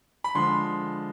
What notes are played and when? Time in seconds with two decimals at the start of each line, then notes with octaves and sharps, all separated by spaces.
0.24 B5
0.35 D3 F3 G#3 C6